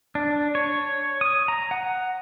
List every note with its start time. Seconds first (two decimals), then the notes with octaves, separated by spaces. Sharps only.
0.15 D4
0.55 C#5
1.21 D#6
1.48 A#5
1.71 F#5